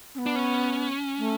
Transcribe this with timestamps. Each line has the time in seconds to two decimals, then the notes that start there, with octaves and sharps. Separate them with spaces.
0.15 C#4
0.18 B3
0.26 D4
0.36 C#4
1.18 A3